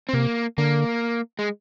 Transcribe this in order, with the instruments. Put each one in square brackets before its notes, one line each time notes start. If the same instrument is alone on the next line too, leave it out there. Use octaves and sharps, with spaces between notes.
[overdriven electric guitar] C4
[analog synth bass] C3 [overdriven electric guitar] A#3
[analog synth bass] D3 [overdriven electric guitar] A#3
[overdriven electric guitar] G#3